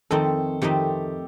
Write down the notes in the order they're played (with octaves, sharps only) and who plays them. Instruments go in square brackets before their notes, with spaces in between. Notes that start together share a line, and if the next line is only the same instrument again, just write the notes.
[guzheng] F2 D#3 A3 C4 D#4 [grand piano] A4
[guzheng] F2 D#3 A3 C4 D#4 [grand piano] G4